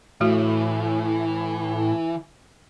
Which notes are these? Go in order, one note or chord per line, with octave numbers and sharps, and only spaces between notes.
A2 E3 A3 F#4